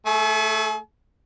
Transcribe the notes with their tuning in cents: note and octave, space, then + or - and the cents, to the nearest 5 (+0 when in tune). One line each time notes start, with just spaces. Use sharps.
A3 +0 G#4 +45 G#5 +45